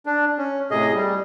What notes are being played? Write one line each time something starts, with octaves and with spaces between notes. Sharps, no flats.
D4
C#4
A2 C3 G#4 D#5
G3